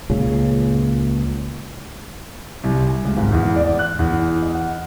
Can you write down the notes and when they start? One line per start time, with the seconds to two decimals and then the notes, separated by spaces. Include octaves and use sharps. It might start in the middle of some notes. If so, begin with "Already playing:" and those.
0.10 C#2 A#2 C#3
2.63 C2
2.88 G#5
3.05 C#2
3.17 G#1
3.32 E2
3.56 D5
3.79 F#6
3.99 E2
4.42 D#5
4.54 F#5